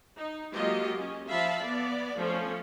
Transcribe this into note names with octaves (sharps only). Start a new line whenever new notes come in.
D#4
F#3 G#3 A#3 F4 G4 D#5
C#4
F3 E5 F5 A5 B5
B3 D5
F3 A3 C#4